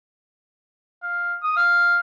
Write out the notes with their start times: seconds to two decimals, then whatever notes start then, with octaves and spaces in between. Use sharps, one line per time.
1.03 F5
1.43 D#6
1.56 F5